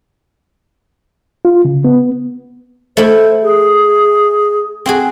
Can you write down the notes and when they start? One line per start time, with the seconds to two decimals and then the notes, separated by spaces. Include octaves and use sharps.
1.45 F4
1.65 C#3
1.85 B3
2.97 A3 E4 C5
3.43 G#4
4.86 C4 F#4 G#4